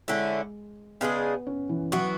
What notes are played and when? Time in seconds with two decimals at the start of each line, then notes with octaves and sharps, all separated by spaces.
0.08 D3 G#3 A3 C#4 E4
1.01 C#3 G#3 B3 D4 G#4
1.47 C#4
1.69 E3
1.92 E3 F#3 B3 F#4